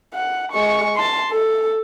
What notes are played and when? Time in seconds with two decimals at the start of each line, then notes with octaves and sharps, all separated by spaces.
0.14 F#5
0.52 G#3 C#6
0.95 A5 C6
1.31 A4